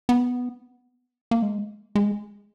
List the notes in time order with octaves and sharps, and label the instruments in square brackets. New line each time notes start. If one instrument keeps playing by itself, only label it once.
[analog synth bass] B3
A#3
G#3
G#3